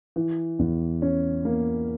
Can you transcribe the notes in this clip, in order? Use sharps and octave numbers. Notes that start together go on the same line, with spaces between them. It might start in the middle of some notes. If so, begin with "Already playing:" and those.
E3
E2
C#4
A#3